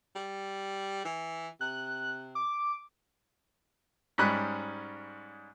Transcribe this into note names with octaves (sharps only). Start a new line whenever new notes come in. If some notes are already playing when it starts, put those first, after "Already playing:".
G3
E3
C3 F#6
D6
G#2 G3 G#3 C#4 B5 F#6